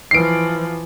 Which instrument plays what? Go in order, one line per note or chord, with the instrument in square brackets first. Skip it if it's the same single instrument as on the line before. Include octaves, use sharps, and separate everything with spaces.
[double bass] E3 F3 [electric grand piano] C7 D7